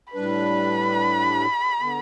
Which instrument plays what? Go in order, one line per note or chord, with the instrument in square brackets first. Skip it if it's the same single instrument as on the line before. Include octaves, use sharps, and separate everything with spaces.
[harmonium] A2 G3 D4 B4 [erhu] B5
[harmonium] D3 B3